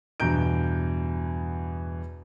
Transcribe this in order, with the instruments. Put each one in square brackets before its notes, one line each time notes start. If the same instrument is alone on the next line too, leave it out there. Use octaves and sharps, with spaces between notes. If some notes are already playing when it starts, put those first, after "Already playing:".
[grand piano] E2 G2 B2 A#5 G6 D7